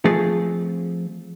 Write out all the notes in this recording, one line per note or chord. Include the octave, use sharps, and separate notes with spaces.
F3 A3 C4 G#4 A5